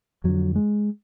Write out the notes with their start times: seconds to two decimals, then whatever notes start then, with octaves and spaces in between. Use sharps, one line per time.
0.24 F2 D3 F#3
0.56 G#3